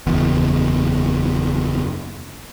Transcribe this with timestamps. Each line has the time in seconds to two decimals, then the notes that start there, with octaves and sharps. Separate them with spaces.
0.07 F#1 E2